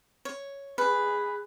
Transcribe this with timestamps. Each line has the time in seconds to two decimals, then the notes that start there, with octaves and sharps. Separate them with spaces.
0.25 C#5
0.78 G#4 B4